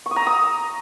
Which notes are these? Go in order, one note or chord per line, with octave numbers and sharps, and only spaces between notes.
C#6
D#6
A#5
E6
D#6